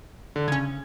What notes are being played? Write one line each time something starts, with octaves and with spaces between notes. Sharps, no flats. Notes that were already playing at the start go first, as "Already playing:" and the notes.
D3
C#3 C#4 G#6